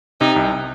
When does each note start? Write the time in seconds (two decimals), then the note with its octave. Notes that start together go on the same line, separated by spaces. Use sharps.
0.21 C3 D#4
0.36 C2